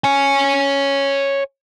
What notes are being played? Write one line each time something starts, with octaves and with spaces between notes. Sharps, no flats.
C#5 G#5